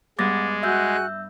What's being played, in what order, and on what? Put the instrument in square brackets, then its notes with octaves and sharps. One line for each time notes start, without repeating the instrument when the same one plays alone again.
[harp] G2 B3 [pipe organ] G#3 [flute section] F#5 [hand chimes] D6 A6 A#6
[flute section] F#4 G#5 F#6 [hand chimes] E5 E6 G6